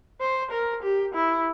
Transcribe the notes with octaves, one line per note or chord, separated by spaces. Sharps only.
C5
A#4
G4
E4